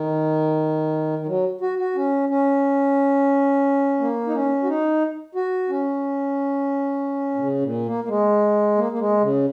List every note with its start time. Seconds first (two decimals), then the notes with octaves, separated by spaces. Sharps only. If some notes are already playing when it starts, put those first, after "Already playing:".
Already playing: D#3
1.19 D#3
1.27 F#3
1.61 F#4
1.78 F#4
1.96 C#4
2.29 C#4
4.00 A#3
4.27 D#4
4.33 C#4
4.63 F#4
4.67 D#4
5.35 F#4
5.69 C#4
7.35 A#2
7.40 C#3
7.63 A#2
7.86 A#3
8.04 A#3
8.08 G#3
8.77 A#3
8.92 A#3
8.98 G#3
9.22 C#3